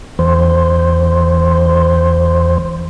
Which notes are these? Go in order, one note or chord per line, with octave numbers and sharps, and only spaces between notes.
E2 C5